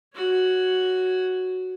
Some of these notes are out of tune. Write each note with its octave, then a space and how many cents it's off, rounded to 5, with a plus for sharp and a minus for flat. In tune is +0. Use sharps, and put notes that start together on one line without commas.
F#4 +0 C#5 +0